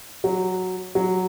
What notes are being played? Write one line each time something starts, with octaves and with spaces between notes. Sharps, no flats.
F#3
F#3